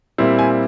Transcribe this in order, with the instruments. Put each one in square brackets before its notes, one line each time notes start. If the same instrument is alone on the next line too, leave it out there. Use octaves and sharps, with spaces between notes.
[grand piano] A#2 G3 C4 E4
G#5